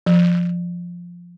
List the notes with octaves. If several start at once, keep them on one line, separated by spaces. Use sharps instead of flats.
F3